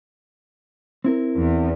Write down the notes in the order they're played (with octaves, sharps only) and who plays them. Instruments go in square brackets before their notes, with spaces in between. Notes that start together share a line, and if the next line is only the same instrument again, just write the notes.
[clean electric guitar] C4 E4 A#4
[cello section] E2